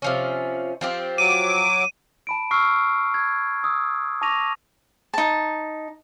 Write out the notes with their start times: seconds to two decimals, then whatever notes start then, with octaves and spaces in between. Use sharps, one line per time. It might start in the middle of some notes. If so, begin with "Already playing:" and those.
0.02 C3 F3 C#4
0.81 F3 C4 G4
1.18 F#3 D6 D#7
2.27 A5 B5 D7
2.51 C#6 E6 F6 C7
3.14 G#6
3.63 D#6 E6
4.21 A5 C#6 D6 A#6 D#7 F7
5.14 D#4 A5